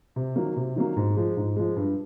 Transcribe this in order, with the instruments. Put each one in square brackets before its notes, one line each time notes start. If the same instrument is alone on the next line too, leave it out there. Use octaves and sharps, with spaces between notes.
[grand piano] C3
D#3 F#3 A#3
C3
D#3 F#3 A#3
G#2
F3 G#3
G#2
F3 G#3
G2